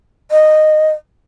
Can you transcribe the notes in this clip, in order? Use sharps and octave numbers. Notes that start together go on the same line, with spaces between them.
D#5